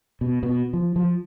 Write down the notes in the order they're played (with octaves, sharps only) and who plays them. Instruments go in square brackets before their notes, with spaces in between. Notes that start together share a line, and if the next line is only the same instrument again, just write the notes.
[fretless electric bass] B2
B2
F3
F3